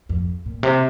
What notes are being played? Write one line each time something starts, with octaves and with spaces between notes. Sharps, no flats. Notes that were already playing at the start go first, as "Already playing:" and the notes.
F2
A#2
C3